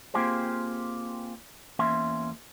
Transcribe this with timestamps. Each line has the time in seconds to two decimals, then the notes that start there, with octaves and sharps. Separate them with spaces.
0.14 A#3 C4 F4 G4 G#4 C5
1.79 E2 A#3 C#4 E5 C6